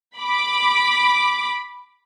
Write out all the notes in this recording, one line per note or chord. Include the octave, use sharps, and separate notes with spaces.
B5 D6